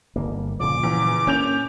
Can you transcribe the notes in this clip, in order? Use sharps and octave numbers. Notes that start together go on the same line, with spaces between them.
G1 A#3
A#2 C#3 F3 D6
E2
A#3 C#4 G6 F7